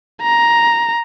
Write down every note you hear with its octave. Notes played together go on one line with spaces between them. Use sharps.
A#5